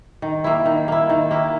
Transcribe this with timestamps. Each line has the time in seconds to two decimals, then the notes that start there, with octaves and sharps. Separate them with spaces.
0.22 D#3
0.44 A#3 E4
0.66 D#3
0.88 A#3 E4
1.10 D#3
1.31 A#3 E4